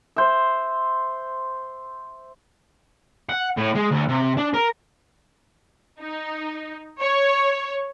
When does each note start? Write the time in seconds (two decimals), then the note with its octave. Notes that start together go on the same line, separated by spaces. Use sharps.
0.16 C5 E5
3.29 F#5
3.57 A2
3.75 G#3
3.91 D2
4.09 C3
4.37 D4
4.54 A#4
6.00 D#4
7.00 C#5